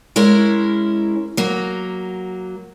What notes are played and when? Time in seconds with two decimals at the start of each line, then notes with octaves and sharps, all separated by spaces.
0.16 G#3 C#4 E4 A#4
1.37 F#3 A#3